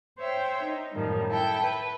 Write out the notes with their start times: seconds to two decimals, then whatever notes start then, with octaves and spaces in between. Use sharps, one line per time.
0.18 C5 C#5 E5 G5
0.63 D#4
0.94 F#2 A2 D#3 F3 G3
1.29 E4 A4 G5
1.62 B4